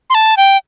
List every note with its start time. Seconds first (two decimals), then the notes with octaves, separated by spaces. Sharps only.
0.10 C6
0.15 A5
0.37 G5